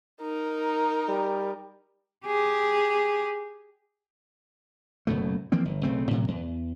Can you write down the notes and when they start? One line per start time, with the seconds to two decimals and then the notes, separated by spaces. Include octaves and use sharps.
0.21 D#4 A#4
1.09 G3
2.26 G4 G#4
5.07 F#1 F#2 B2 A3
5.52 E3 F3 A#3 C4
5.65 G1
5.83 B1 C#3 A3 C4
6.11 A2 C3 F#3
6.28 E2